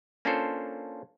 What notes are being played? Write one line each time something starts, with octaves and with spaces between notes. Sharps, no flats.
A#3 C#4 D4 F4 A4 C5